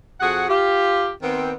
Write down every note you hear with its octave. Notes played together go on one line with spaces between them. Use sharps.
F2 F#4 G#4 F#5
F4 G4
D#3 B3 C4